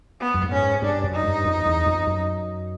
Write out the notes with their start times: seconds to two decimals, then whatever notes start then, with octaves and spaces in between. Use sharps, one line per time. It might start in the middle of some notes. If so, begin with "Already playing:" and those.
0.20 B3
0.34 F#2
0.43 G2
0.52 G#2 C#4
0.82 G2 D4
1.04 F#2
1.14 D#4
1.24 G2
1.45 F2
1.66 E2
1.86 F2
2.07 F#2